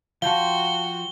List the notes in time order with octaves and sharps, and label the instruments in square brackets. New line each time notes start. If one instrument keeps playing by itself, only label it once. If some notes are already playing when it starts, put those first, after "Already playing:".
[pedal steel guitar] F3 G5 C6 [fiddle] F#4 [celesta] F5 A5 [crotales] G7